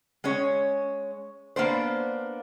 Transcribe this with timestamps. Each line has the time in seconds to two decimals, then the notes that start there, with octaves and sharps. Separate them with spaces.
0.24 G#3 C#4 C#5
1.56 A#3 B3 D4 C5